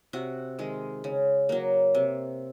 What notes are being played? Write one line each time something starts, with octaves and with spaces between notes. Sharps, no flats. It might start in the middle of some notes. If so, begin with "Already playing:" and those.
C3 F#4
D#3 G#3
C#3
F#3 A#3
C3